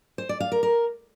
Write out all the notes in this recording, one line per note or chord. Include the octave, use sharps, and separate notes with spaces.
C5
D5
F5
A#4
A#4